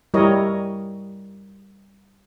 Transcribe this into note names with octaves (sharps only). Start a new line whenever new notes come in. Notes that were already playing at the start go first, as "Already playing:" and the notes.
G3 E4 A#4 C#5 D#5